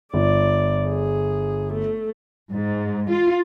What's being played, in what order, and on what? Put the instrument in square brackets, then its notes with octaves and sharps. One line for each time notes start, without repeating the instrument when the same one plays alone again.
[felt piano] G1 [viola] D5
[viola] G#4
A3
[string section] G#2
F4